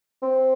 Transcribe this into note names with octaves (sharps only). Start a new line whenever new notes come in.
C4